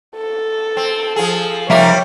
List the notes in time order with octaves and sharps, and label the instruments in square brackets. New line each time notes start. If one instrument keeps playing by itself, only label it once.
[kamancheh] A4
[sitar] C4
F3 G#4
[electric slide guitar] F3 E5 [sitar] G3 A#3 [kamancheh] C#5 G5